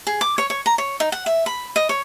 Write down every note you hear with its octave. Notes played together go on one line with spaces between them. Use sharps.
G#4
D6
C#5
C#5
A#5
C#5
D#4
F#5
E5
B5
D#5
C#5